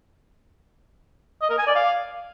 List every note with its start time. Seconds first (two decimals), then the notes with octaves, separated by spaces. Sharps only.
1.41 D#5
1.50 A#4
1.58 G#5
1.67 D5
1.75 F5